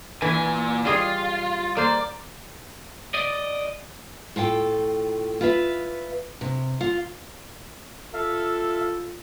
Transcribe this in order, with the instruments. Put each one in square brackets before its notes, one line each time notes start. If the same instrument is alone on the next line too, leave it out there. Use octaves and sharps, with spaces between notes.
[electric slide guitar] A#2 G#5 [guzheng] E3
[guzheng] G3 G#4 D#5 [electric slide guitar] F4
[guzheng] A#3 C5 C6 [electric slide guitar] D5
[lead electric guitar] D5 D#5
[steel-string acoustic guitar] A2 F4 A4 G5
F4 B4 E5
C3
F4
[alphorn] F4 [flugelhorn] A4 [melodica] E5 F5